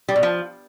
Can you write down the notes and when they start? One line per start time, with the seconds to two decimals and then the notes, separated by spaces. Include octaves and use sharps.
0.09 G3
0.16 B2
0.23 F3